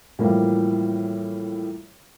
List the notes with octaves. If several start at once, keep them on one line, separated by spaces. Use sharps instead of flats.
A2 E3 F3 G3 A#3